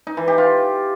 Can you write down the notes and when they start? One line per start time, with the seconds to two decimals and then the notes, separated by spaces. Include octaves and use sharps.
0.07 D#4
0.17 E3
0.28 G4
0.38 F4